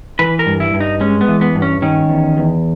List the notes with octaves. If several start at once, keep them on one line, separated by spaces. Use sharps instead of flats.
E3 B4
A#4
G2
E4
G2
D#4
G#3 C#4
B3
E3
B3
G2
C#4
D#3 C#4
E2
E2